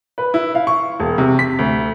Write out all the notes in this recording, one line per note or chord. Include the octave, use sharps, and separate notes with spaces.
B4
E4
F5
C#6
E1
C3
B6
D2